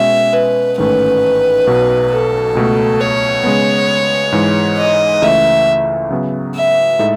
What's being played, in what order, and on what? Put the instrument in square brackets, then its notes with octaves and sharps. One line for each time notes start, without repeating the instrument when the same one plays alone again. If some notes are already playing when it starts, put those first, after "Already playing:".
Already playing: [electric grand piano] B2 G#3 C#4 [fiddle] E5
[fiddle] B4
[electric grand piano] A1 G#2 D#3 A3 C#4 [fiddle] B4
[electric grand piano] B1 B2 F#3
[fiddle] A4
[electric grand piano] C#2 B2 A3
[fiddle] C#5
[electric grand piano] C#3 G#3 B3
G#2 E3 G#3
[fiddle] D#5
[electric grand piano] C#2 C#3 E3 A3 [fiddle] E5
[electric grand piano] C#3 F#3 B3
[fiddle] E5
[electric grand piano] A2 G#3 D#4 A4